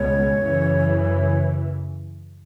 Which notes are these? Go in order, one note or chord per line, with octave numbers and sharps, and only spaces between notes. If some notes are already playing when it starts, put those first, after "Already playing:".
Already playing: C#2 B2 G#3 B3 C#5
F#2 C#3 E3